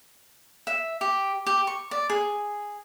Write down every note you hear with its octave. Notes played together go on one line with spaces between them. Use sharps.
E5
G4
G4
C#6
D5
G#4